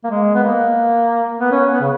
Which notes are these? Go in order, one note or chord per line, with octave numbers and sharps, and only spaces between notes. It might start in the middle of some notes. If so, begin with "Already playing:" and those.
A#3
G#3
B3
A#3
B3
C#4
B3
C#3